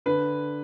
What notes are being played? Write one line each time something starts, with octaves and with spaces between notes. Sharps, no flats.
D3 B4